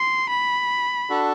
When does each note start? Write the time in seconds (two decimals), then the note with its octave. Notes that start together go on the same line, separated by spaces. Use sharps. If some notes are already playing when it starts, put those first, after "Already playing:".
Already playing: C6
0.29 B5
1.10 D4 F#4 A4